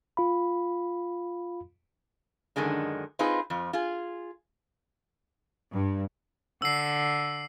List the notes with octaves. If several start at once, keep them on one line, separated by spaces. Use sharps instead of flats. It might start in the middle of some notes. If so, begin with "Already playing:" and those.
F4 F5 B5
F#2 D3 D#3 G#3 D4
C4 D#4 F4 G#4 B4
F2 F3
F4 G#4
G2
D3 E6 C7